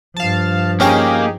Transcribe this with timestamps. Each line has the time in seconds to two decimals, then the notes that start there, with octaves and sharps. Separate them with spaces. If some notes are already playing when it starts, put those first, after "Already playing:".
0.17 G2 F3 F5 A5
0.80 A#3 C#4 D#4 G4 G#4 G5